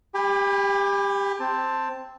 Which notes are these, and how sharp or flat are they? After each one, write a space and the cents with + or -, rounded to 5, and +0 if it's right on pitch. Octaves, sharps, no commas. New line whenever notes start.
G4 +15 G#5 -45 B5 +0
C4 +0 A5 +10